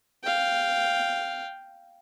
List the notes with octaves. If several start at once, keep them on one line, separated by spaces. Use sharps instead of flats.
F5 G5